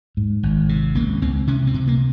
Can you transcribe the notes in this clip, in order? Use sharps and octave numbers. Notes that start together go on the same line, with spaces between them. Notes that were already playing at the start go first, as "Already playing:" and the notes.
G#2
G#1
C3
C#2 A#3
C#2 C4
C3 C#4
C4
C3
A#3